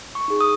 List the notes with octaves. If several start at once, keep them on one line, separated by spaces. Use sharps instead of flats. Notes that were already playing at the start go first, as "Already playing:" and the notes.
C#6
D#4 G#4
D#6